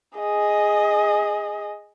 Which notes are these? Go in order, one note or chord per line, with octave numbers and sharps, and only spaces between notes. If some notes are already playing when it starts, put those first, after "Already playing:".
G#4 D#5